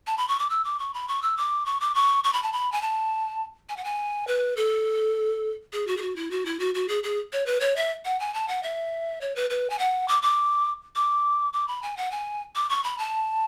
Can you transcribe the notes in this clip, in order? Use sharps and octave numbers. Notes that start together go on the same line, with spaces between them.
A5
B5
C#6
D6
E6
D6
C#6
B5
C#6
E6
D6
C#6
D6
C#6
C#6
B5
A5
B5
G#5
A5
G#5
F#5
G#5
B4
A4
G#4
F#4
G#4
F#4
E4
F#4
E4
F#4
F#4
G#4
G#4
C#5
B4
C#5
E5
F#5
G#5
A5
F#5
E5
C#5
B4
B4
G#5
F#5
D6
D6
D6
D6
B5
G#5
F#5
G#5
D6
C#6
B5
A5